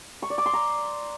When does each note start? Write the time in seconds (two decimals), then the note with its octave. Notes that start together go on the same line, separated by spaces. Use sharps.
0.22 C#6
0.30 D5
0.38 D6
0.46 C6
0.53 A#5